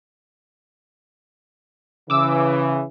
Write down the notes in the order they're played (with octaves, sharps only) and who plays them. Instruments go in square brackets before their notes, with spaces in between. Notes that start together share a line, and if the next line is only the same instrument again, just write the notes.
[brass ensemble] C#3 E3 [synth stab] D6 E6